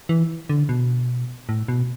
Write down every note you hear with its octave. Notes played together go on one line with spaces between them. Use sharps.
E3
D3
B2
A2
B2